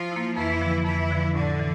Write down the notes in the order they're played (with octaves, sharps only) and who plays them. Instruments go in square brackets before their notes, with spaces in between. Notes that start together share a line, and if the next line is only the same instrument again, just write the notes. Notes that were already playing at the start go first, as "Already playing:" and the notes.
Already playing: [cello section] F3 F4
[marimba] A#3 E4
[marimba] F2 [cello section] E3 E4
[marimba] D3 F3
[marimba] F2 [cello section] E3 E4
[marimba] D3 F3
[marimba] A2 [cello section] D3 D4
[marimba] E3